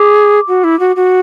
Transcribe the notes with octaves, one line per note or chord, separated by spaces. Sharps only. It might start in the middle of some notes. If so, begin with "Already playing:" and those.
Already playing: G#4 D6
F#4
E4
F#4
F#4